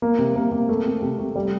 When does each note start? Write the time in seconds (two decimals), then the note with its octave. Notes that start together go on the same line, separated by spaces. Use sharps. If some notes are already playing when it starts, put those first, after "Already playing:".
0.02 A#3
0.19 C3
0.36 A#3
0.52 A#3
0.69 A3
0.86 C4
1.02 C3
1.19 A3
1.36 G3